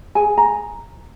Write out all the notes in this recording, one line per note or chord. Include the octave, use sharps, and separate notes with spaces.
G#4 G#5
A#5